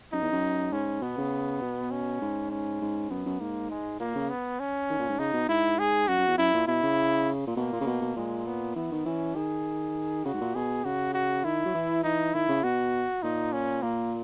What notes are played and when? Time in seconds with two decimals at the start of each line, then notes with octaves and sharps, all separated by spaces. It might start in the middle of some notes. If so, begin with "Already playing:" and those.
0.13 F#2 D#4
0.21 E2
0.32 F#2
0.72 G#2 C#4
1.02 B2 B3
1.18 C#3
1.62 B2
1.91 C#4
2.21 G#2
2.51 C#4
2.81 G#2
3.10 F#2 B3
3.26 F#2
3.40 G#2 A#3
3.70 G#3
4.00 A#2 A#3
4.15 C#3
4.30 B3
4.60 C#4
4.90 D#3
4.99 A#2
5.09 G#2
5.19 C#3 D#4
5.33 B2
5.48 G#2 E4
5.79 G#4
6.08 F#2 F#4
6.19 F#2
6.28 E2
6.38 F#2 E4
6.54 A#2
6.67 B2 E4
6.83 C#3
7.47 A#2
7.57 B2 A#3
7.72 A#2
7.81 C#3
7.86 B2
8.02 B2
8.16 A#2 G#3
8.46 B3
8.76 E3 B3
8.92 D#3
9.05 E3 C#4
9.36 D#3 G#4
10.25 C#3 F#4
10.34 G#2
10.41 A#2
10.55 B2 G#4
10.85 C#3 F#4
11.14 F#4
11.44 D#3 E4
11.65 F#3
11.75 E3
12.04 E3 D#4
12.34 D#3 E4
12.49 C#3
12.64 B2 F#4
13.23 A#2 D#4
13.52 C#4
13.82 A#2 A#3